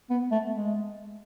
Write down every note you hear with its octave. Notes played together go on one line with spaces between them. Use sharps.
B3
A3
G#3